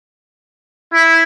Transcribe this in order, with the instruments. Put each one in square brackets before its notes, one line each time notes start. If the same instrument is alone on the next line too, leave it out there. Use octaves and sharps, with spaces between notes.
[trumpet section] E4